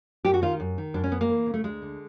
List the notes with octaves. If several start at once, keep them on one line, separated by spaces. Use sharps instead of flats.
F#2 G4
F#4
D#3 F4
F#2
D#3
F#2 D4
C#4
F#2 B3
A#3
E3
C#3
A3
D2 G#3
D3